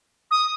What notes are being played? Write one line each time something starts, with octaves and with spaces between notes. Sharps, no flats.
D#6